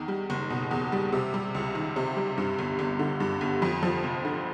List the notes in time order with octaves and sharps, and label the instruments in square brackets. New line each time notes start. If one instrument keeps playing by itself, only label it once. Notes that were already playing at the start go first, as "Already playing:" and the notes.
Already playing: [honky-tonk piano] E2 D#3
G3
F#1
B2
E2
G3
C3
G3
C#2
D#3
C3
G3
G2
G1
G1
D3
G2
G1
F2
F3
F1
D3